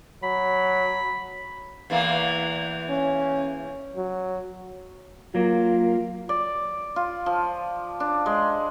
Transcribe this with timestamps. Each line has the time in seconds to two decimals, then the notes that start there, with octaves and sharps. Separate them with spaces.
0.23 F#3 B5
1.90 E2 E3 A#3
2.90 C#4
3.96 F#3
5.35 F#3 A#3 F4
6.29 D5
6.96 F4
7.26 F3
8.00 D4
8.26 G#3